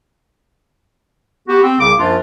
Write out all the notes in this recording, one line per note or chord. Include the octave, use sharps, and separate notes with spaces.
B3 F#4 G4
C4
C2 C#3 D6
F#2 F3 A#3 D4 F4